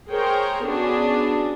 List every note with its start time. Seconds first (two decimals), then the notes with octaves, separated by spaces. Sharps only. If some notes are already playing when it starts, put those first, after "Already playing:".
0.10 G#4 A#4 C5 C#5 G5
0.65 B3 C#4 D4 F#4 G#4